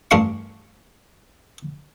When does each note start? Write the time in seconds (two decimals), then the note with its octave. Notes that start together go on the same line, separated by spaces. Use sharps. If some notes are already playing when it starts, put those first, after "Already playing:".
0.11 A1 G2 D4 F5 C6 C#6